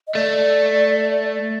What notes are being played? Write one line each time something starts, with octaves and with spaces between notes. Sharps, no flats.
D#5
A3 D5